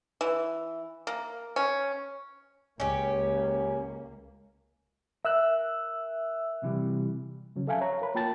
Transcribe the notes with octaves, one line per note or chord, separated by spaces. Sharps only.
E3
A#3
C#4
C#2 A#3 C#4 G4
A#4 E5 E6 F#6
C3 E3 G3
C#3 F#3 C#4
A4 E5 F5 G#5 A5
C#5 A#5
A#4 B5
A#3 F4 G5 A5 A6